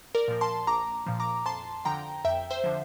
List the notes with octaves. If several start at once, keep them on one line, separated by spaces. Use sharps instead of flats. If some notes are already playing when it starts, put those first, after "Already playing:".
A#4 D5
A#2 F3
A5 C6
A#1 A#5 D6
A#2 F3
A#5 D6
F2 A5 C6
D3 F3 G5 A#5
F2 E5 G5
C5 E5
D3 F3